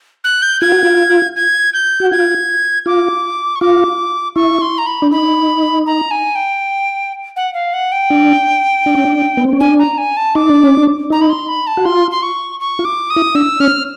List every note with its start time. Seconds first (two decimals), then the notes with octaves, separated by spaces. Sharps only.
0.24 F#6
0.42 G6
0.61 F4 G#6
0.72 F#4
0.83 F4
1.36 G#6
1.73 G6
2.00 F#4
2.11 F4 G#6
2.86 F4 D6
3.56 C#6
3.61 F4 D6
4.36 E4 C#6
4.61 C6
4.78 A#5
4.86 B5
5.02 D4
5.11 D#4 B5
5.86 A#5
6.11 G#5
6.35 G5
7.36 F#5
7.54 F5
7.73 F#5
7.92 G5
8.10 D4
8.86 D4
8.95 C#4
9.05 D4
9.37 B3
9.44 C4
9.53 C#4
9.60 D4 G#5
9.79 A#5
9.98 G#5
10.17 A5
10.35 D#4 D6
10.49 D4
10.63 C#4
10.77 D4
11.10 D#4 A#5
11.21 B5
11.30 C6
11.48 B5
11.67 A5
11.77 F#4
11.85 F4 C6
12.11 C6
12.23 C#6
12.60 C#6
12.79 F4
12.85 D6
13.10 D#6
13.16 E4
13.35 D4 E6
13.60 C#4 F6